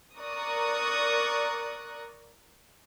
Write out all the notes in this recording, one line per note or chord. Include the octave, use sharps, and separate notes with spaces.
A#4 D5 A#5 C#6 D#6 F#6